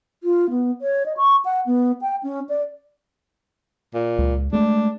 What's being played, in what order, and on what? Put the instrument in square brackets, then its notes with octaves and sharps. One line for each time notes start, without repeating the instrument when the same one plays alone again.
[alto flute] F4
B3
C#5
D#5
C#6
F#5
B3
G5
C#4
D5
[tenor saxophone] A#2
[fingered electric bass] C#2
[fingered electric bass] G#3 A3 [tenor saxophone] D4